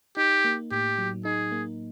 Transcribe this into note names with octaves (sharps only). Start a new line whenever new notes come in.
D#4 G4
A#3
A2 G4
F#3
D#4 G#4
A#3